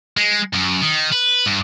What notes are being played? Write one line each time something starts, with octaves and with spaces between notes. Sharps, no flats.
G#3
F#2
D#3
B4
G2